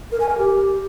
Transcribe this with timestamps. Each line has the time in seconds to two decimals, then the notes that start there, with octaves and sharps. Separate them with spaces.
0.12 A#4
0.20 G#5
0.29 A#4
0.38 G4